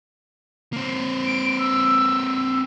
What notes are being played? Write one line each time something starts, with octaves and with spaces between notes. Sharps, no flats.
A#3 C4
D7
E6